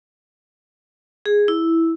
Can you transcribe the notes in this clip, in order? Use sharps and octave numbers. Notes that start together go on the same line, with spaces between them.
G#4
E4